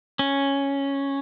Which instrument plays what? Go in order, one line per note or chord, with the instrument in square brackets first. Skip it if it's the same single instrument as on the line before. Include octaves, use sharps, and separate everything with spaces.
[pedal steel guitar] C#4